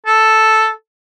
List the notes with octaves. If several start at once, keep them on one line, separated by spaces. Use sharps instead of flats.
A4